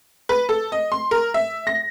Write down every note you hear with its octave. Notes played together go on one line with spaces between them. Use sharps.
B4
A4
D#5
C6
A#4
E5
A#6